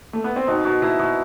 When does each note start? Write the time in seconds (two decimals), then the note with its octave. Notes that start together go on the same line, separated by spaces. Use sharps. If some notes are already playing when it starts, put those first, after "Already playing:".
0.13 A3
0.24 B3
0.36 C4
0.48 B2 D#4
0.65 B2
0.82 B2 E4
0.99 B2